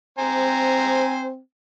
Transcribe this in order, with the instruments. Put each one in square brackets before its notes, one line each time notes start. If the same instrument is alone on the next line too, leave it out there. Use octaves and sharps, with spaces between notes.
[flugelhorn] C4 [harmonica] C5 G#5 A#5